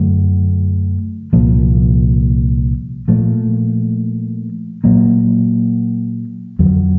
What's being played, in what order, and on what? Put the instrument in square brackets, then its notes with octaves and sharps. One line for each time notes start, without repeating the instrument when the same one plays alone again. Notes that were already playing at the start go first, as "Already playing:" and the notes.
Already playing: [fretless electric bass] F#2 D3 F#3 A3
C2 A#2 F3 A#3
A#2 F3 A3
A#2 F#3 A#3
F2 D3 F#3